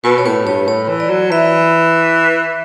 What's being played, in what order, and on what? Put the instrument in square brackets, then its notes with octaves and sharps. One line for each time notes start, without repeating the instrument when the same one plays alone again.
[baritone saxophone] B2 [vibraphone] B4
[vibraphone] C#5
[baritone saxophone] A2 [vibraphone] B4
[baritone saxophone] G2 [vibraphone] C#5
[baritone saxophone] A2 [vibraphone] C#5
[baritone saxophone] E3
[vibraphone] D5
[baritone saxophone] F#3
[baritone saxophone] E3 [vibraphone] E5